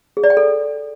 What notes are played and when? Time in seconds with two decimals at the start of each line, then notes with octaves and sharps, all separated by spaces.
0.17 G#4
0.24 D5
0.30 G5
0.37 A4